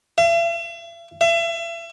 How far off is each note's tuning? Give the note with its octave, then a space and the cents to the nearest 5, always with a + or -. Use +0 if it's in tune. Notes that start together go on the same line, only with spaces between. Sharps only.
E5 +45
E5 +35